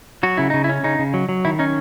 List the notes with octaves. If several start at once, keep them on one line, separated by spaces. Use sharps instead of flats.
F#3 F#4
C#3 E4
C#3 D#4
E4
C#4
C#3 D#4
C#3
F#3
F#3
D#3 E4
C#4 D#4